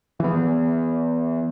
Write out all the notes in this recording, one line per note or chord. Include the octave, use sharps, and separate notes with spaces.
E3 B3